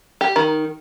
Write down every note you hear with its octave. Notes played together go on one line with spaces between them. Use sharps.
G4
D#3